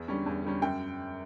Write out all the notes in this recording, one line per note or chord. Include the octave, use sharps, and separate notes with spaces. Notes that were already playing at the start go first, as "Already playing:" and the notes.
Already playing: E2
D3 G3 C#4
E2
D3 G3 C#4
F#2 G5